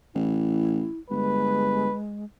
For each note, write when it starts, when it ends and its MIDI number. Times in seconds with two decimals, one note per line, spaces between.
0.15 0.86 33
0.15 0.99 64
1.10 1.88 31
1.10 2.25 56
1.10 1.94 71